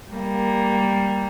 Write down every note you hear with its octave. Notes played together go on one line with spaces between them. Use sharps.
G3 A#3